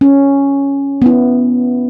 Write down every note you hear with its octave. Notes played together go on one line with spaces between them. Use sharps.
C#4
B3 E4